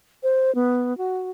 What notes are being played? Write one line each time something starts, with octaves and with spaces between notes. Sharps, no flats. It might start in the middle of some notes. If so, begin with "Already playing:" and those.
C5
B3
F#4